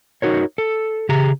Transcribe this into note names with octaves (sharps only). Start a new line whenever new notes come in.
D#4 F#4 A#4 C#5
A4
C#3 G4 G#4 A#5